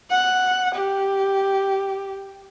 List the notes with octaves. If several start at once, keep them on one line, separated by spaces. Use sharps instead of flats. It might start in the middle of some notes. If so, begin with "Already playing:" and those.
F#5
G4